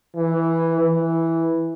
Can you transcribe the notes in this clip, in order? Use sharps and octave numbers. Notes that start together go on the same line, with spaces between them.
E3
E3